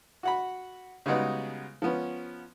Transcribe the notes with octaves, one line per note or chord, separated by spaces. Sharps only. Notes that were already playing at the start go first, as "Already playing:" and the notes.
F#4 F#5 B5
C#3 G3 G#3 B3 D#4 F#4
F3 B3 C#4